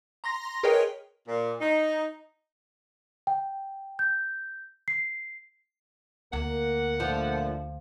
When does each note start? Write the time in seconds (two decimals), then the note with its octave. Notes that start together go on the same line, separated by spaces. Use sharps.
0.24 A#5 C6 A#6
0.63 G#4 A#4 B4 C#5 D#5 G5
1.28 A#2
1.60 D#4
3.27 G5
3.99 G6
4.88 C7
6.33 D2 A#3 A#4 F#5
7.00 A#2 D3 F3 A3